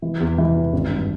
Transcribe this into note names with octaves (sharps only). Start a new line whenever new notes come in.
E3
E2
E3
E2
G#1
G2